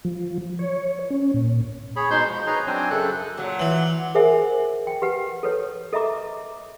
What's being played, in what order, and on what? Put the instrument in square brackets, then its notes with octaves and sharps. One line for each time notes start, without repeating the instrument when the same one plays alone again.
[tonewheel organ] F3
C#5
C#4
A#2
[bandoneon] G#4 C#5 B5
B2 G#3 D#4 C5 C6 G6
F3
D#4 G#4 B4 C#5 A#5 C6
F#3 C4 D4 C5 G#5
F#2 C#3 A4 F#6
[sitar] A#2 F#3
[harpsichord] E3
[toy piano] G#4 A#4 C5 E5 F#5 G#5
G5
G4 B4 F#5
A4 B4 C#5
A4 D#5 E5 A#5 D6